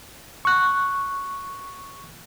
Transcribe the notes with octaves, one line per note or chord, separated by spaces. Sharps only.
C#6 F#6